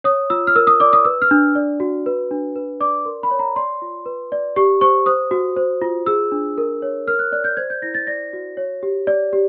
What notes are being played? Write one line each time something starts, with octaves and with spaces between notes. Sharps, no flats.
C#5 D#6
F4 E6
F6
A#4 E6
D#6
D5 D6
D#6
B4 E6
F6
D4
D5
F#4
B4
D4
B4
D5 D6
A#4 C6
B5
C#5
A#5
D5 C6
F4
B4
D5
G4 C#6
C5 C#6
C5 D#6
F#4
C5
F4
G#4 E6
D4
A#4
C#5
A#4 F6
F#6
D5 F#6
G6
C5 G#6
G6
E4 A#6
A6
D5 A#6
F#4
C#5
G4
D5
G4